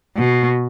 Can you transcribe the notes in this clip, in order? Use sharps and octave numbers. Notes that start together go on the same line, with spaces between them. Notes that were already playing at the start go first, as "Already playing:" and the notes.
B2